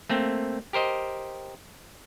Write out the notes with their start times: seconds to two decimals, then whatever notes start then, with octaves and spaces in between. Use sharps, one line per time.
0.09 A3 A#3 C4
0.73 G4 A#4 C5 D#5